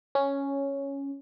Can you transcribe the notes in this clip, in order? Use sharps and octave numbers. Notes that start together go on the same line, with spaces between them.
C#4